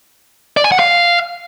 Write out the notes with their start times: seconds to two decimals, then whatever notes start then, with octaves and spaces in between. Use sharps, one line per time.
0.57 D5
0.64 G#5
0.72 F#5
0.79 F5